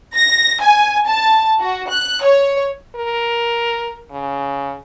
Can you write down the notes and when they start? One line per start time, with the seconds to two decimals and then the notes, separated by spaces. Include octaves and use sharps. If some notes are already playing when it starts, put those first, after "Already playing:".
0.15 A#6
0.61 G#5
1.07 A5
1.60 F#4
1.89 F#6
2.24 C#5
2.96 A#4
4.11 C#3